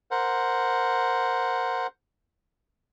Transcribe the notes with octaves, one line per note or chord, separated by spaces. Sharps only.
A#4 C5 F#5